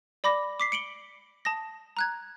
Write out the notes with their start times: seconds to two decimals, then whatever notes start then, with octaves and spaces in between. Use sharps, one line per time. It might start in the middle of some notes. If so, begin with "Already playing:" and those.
0.24 D5 B5 D6 A#6
0.60 D6 B6 C7
0.72 C#7 D7 F#7 G7
1.45 A5 D#6 A#6
1.97 A#5 F#6 G#6